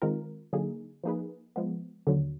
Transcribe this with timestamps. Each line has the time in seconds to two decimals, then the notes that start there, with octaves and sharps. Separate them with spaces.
0.02 D#3 G#3 C4 F4 A#4
0.53 D3 F#3 A#3 D#4 G#4
1.04 F3 A#3 D#4 G#4 B4
1.56 F3 G#3 B3
2.07 D#2 D3 F#3